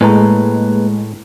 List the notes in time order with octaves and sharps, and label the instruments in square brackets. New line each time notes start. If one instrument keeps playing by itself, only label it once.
[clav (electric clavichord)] A2 [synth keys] G#3 [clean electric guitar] A#3 B4 A#5